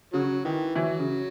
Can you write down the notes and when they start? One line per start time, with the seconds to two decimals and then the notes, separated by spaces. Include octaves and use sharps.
0.13 C#3 F#3
0.45 D#3 E3
0.75 E3 F#3
0.99 C#3